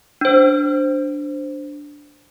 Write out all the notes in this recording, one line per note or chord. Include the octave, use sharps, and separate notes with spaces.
D4 C5